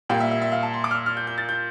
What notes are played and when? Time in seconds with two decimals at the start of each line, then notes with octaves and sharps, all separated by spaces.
0.10 A#2 G3 A#3 G5
0.20 E5
0.31 E5
0.42 E5
0.52 F5
0.63 A5
0.74 C6
0.84 D6
0.91 F6
0.95 E6
1.06 F6
1.17 G6
1.27 G6
1.38 A6
1.49 G6